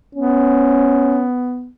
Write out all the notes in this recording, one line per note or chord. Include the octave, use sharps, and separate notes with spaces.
B3 C#4